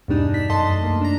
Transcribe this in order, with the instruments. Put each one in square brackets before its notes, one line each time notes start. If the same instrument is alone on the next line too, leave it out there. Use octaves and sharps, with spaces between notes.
[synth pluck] E2 G2 B2 G3 D4 D#4
D4 B6
F#2 A3 D#5 A5 C6
C2 A#3
D4 A#5